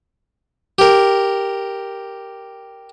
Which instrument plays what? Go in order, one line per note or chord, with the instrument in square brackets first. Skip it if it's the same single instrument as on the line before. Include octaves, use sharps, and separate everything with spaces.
[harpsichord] G4 A#4